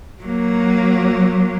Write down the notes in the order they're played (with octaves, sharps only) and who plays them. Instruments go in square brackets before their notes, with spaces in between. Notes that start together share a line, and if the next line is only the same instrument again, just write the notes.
[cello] F#3 A#3